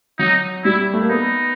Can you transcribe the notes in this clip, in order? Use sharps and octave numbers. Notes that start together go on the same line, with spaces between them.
F#3 D#4
G3 E4
A3
A#3
B3 D#4